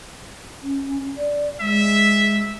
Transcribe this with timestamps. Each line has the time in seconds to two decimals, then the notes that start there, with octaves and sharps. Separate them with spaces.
0.63 C#4
1.17 D5
1.60 G#3 E5